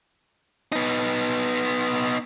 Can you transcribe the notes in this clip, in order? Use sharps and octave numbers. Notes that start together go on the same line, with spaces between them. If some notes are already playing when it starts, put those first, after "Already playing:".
B3 D#4